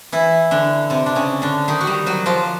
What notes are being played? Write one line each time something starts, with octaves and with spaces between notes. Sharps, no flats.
E3 E4
D3 D4
C3 C4
D4
C#3 C#4
D3 D4
D#3 D#4
F#4
G3 G4
F#3 F#4
F3 F4